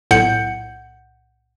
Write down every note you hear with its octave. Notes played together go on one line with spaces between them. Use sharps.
B1 A2 F#5 G6 C#7